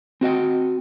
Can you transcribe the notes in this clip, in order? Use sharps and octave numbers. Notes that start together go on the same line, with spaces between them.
C4 F#4 D#5 G5